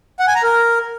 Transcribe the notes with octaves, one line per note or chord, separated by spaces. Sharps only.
F#5
G#5
A#5
A#4